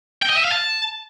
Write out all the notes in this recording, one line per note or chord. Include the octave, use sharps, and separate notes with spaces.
G5
D#5
E5
F5
A5